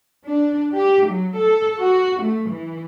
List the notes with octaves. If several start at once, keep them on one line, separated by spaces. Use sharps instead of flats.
D4
G4
F#3
A4
F#4
A3
E3